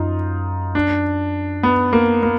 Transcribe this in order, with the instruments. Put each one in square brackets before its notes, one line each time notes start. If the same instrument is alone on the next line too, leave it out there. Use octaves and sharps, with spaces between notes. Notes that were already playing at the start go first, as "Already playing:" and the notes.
Already playing: [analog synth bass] F#2 [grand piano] D#4 F4
[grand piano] D4
B3
A#3
A#3